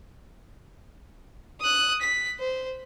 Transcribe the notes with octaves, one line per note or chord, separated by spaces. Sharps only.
D#6 F#6
B6
C5